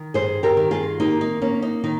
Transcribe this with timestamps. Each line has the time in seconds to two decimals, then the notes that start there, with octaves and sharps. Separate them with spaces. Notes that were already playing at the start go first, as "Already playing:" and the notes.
Already playing: D#3
0.14 G2 G#4 C5
0.43 G4 A#4
0.57 D#3
0.71 F4 G#4
1.00 A#3 D#4 G4
1.21 D#4
1.41 A#3 C#4
1.62 D#4
1.84 D#3 D#4